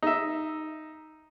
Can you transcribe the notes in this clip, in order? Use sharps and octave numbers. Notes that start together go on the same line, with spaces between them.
D#4 E5